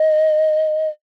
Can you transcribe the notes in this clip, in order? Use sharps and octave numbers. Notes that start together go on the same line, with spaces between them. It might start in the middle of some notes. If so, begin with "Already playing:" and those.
Already playing: D#5